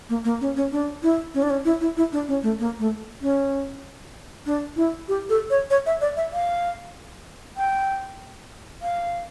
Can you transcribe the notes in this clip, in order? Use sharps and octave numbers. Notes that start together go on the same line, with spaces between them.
A#3
A#3
C#4
C#4
D4
E4
C#4
D4
C#4
E4
E4
E4
D4
C#4
A3
A#3
A3
C#4
D4
E4
G4
A4
C#5
C#5
E5
D5
E5
F5
G5
F5